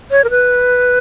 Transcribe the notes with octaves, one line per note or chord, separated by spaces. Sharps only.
C#5
A#4
B4